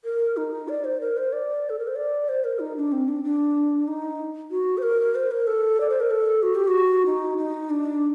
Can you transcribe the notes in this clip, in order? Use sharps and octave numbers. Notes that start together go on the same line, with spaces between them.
A#4
D#4
D5
C5
A#4
C5
D5
A4
A#4
C5
D5
C5
A#4
D#4
D4
C4
D4
D4
D#4
F#4
C5
A#4
C5
A#4
A4
D5
C5
A#4
A4
F#4
G4
F#4
D#4
D#4
D4